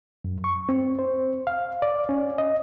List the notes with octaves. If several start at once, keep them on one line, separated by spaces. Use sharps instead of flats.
F#2
C#6
C4
C5
F5
D5
C#4
D#5